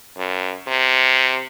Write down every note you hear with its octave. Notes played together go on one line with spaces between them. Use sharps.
F#2
C3